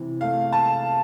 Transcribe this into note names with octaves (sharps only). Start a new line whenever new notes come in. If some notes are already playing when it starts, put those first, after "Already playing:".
Already playing: C3 E3
A3 F5
A5